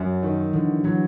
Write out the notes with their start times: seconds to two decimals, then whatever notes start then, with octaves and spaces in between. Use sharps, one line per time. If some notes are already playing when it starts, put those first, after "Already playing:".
Already playing: F#2 F#3
0.23 D#3
0.53 D3 E3
0.84 E3 F#3